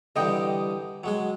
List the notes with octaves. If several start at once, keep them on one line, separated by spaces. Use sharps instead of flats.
D3 E3 G3 D#5 G5
F#3 G#3 G#4